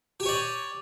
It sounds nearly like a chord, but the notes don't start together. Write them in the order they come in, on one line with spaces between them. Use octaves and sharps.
G4 G#5 C#5 D5